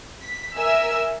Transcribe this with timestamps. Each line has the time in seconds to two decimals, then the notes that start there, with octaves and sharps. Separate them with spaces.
0.22 B6
0.56 A#4 E5 G#5 E6